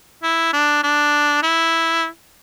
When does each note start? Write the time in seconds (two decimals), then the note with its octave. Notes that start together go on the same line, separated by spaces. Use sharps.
0.23 E4
0.53 D4
0.83 D4
1.43 E4